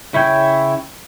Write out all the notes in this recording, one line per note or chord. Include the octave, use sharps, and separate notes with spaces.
C#3 E4 C#5 G5 G#5